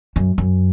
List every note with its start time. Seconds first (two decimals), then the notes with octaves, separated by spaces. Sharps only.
0.16 F#2
0.38 F#2